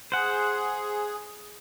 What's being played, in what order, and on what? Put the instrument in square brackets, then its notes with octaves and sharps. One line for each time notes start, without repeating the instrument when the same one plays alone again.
[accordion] G#4 [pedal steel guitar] C5 F#5